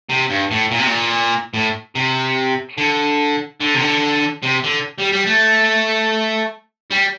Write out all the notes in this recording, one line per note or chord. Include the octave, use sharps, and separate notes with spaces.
C3
G2
A2
A#2
C3
A#2
A2
C3
D3
D3
C3
D3
C3
D3
G3
G3
A3
G3